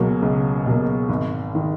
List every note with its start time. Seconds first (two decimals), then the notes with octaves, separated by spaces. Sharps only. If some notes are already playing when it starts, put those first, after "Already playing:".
Already playing: C#2 B2 F#3 A#3
0.22 C#2
0.66 B2 F#3 A#3
1.09 G#1
1.55 D#3